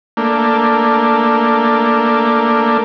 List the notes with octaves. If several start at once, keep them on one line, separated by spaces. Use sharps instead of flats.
A3 A#3 D4